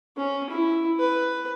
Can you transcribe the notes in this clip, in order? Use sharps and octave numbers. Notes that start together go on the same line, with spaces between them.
C#4
E4
B4